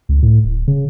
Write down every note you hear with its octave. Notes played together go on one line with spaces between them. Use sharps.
C#2
A2
D1
C#3